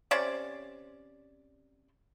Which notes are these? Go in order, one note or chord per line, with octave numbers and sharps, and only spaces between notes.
C3 C#4 C5 D5